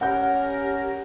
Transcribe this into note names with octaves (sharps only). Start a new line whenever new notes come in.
C#4 G4 A#4 F#5 G6